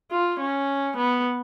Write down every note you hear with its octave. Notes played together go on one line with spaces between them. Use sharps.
F4
C#4
B3